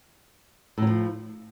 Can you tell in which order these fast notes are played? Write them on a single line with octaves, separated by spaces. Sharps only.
A2 F#3 F3